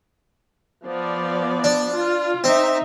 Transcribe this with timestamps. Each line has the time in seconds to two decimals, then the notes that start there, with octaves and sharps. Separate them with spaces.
0.85 F3 B3 D5
1.64 D4
1.93 F4
2.44 C4 D#4 E5